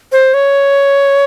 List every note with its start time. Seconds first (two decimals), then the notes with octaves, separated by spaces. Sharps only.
0.12 C5
0.34 C#5